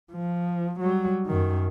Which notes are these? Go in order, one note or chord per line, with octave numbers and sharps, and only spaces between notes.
F3
F#3 G3
F#2 D#3